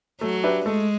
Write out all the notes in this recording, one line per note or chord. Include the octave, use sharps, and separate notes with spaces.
F#3 A3
D4 G4 B4 E5
G#3 A3